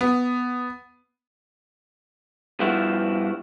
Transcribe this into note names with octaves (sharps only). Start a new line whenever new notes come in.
B3
G2 F3 B3 E4 F#4